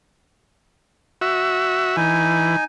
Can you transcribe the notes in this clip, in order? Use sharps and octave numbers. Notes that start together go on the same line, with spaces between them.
F#4 E5
E3 D#4 G#5